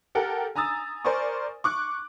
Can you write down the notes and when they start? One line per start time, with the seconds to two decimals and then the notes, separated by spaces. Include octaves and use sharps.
0.15 G4 A4 A#4 F#5 G5
0.56 G#5 A#5 D#6 E6 A6
1.05 A#4 C5 D5 G#5 C#6
1.64 C#6 D6 F#6